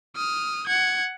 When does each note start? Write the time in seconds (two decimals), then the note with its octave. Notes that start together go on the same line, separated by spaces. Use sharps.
0.16 D#6 F6
0.67 F#5 G#6